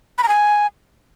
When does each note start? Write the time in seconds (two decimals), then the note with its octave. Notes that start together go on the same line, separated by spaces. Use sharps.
0.18 B5
0.23 A#5
0.28 G#5